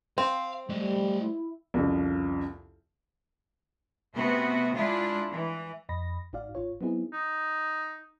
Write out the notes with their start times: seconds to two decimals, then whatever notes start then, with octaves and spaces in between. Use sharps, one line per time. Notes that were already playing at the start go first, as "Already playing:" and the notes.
0.18 C4 F5
0.69 G3 A3 D#5
1.22 E4
1.74 C2 F2 C#3
4.15 C3 A3 B3 F#4
4.75 G#3 D4 E4 F4
5.30 E3
5.89 F2 D#5 B5 A#6
6.33 G#1 G#2 D#4 F#4 D5 F5
6.55 G#1 F4 C#5
6.81 F#3 B3 C4 D#4 E4 G#4
7.13 D#4